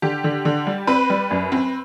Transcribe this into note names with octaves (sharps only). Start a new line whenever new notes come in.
D3 G4
D3
D3
G3
C4 B4
G3
F#2
C4